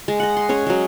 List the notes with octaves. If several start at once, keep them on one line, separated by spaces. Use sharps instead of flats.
G#3
D#5 F#5
C6
C#4 G#4 C#5
F#3 G#3